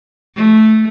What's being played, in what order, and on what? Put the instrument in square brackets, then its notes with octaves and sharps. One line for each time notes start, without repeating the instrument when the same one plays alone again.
[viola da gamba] A3